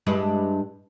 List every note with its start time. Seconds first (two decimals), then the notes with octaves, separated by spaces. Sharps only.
0.07 G2 G#3 E4